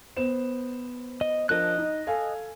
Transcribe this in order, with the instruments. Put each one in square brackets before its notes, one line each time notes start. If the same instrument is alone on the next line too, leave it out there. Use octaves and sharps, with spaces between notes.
[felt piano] B3 C5 E7
[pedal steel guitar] D#5
[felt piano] F3 D4 A#4 [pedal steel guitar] D#5 F#6
[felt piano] D#4
A4 F5 G#5